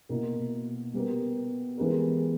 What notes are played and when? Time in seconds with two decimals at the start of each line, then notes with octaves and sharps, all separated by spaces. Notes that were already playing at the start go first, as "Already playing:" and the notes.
0.09 B2 A#3 E4 A#4
0.94 G3 B3 G4 A#4
1.78 E3 G#3 B3 G4 A#4